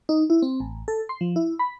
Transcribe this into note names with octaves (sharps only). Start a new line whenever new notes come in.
D#4
E4
C4
A1
A4
C6
F3
E4
B5